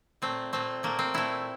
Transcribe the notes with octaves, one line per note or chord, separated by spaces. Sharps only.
A#2 A3 C4
A#2 A3 C4
A#2 A3 A#3
C4
A#2 A3 E4